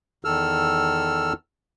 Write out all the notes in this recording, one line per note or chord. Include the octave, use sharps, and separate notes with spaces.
E2 D#3 A4 E6 F6